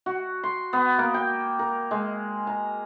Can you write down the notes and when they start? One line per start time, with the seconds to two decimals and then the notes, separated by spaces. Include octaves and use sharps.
0.06 F#4
0.43 C6
0.73 B3
0.98 A#3
1.14 G5
1.59 A#4
1.91 G#3
2.47 A#5